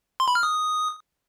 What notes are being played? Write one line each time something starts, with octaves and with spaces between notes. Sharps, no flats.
C6
B5
F6
D#6